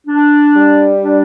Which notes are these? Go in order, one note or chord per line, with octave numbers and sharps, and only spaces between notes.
D4
G3
D4